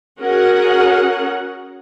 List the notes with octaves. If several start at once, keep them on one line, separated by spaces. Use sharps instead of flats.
C#4 F#4 G#4 A#4 F#5